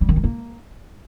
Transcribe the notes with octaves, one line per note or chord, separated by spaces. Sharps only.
G3
D#3
G#3
A#3